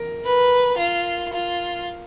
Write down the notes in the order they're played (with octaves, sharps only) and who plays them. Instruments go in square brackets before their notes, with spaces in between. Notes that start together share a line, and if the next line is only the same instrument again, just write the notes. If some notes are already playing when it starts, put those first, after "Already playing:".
Already playing: [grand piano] A#4
[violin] B4
F4
F4